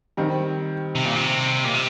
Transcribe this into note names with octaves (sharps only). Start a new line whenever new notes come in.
D#3 G3 C4
C3
A#2
C3
A#2
C3